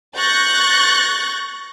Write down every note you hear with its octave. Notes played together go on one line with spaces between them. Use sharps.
C#6 F#6 G6 A6 A#6